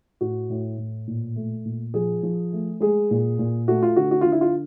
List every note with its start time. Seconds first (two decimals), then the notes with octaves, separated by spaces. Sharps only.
0.21 A2 F#4
0.50 A2
0.78 A2
1.07 A#2
1.36 A3
1.65 A#2
1.94 F3 G#4
2.23 F3
2.53 A3
2.81 G#3 G#4
3.11 A#2
3.39 A#2
3.68 A3 F#4
3.83 F4
3.96 D3 F#4
4.11 F#4
4.21 D3 F4
4.32 E4
4.41 F4